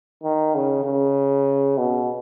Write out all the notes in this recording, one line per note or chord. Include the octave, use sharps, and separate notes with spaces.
D#3
C#3
C#3
B2